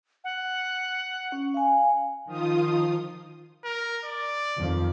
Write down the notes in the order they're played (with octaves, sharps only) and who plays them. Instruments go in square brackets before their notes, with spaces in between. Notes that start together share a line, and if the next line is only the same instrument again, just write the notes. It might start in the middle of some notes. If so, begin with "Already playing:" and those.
[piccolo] F#5
[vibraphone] C#4
F5 G#5
[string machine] D#3 F3 F4 D#6
[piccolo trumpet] A#4
D5
[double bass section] F2 D#3 F3